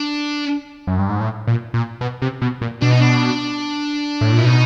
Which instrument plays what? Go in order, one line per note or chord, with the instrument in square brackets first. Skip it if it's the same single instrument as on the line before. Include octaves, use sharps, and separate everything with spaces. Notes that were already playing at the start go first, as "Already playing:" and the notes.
Already playing: [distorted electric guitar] D4
[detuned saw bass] F#2
G2
G#2
A2
A#2
A#2
B2
C3
B2
A#2
[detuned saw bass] B2 [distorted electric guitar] D4
[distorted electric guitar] D#4
D4
[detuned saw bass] A2
A#2
[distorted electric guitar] E4
[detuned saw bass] B2 [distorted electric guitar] D#4